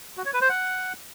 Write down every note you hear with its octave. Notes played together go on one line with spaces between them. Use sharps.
F#4
C#5
B4
C5
F#5